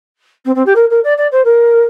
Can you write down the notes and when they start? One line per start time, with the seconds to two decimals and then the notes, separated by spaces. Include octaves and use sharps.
0.45 C4
0.55 C4
0.66 G4
0.75 A#4
0.90 A#4
1.03 D5
1.17 D5
1.31 C5
1.44 A#4